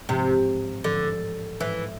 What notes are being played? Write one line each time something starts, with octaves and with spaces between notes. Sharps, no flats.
A1 G#2 C3 F3
A1 G#2 D3 F3
A1 G#2 E3 F3